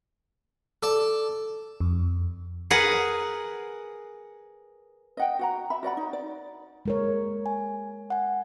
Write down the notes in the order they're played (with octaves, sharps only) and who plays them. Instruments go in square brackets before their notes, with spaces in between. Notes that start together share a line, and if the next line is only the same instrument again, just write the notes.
[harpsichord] A4 D5 A5
[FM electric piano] F2
[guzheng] G#4 A#4 B4 F#5
[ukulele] D#5 F#5 G5
F#4 F#5 A#5
E5 B5
F#4 D5 F#5 B5
D#4
D5
[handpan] G#3 A#4 C#5
[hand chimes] G#5
F#5 G#5